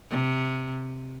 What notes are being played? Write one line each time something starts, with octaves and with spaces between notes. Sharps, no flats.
C3